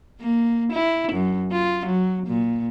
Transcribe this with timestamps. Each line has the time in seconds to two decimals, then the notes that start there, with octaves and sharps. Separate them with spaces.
0.21 A#3
0.73 E4
1.12 F#2
1.52 F4
1.86 F#3
2.27 A#2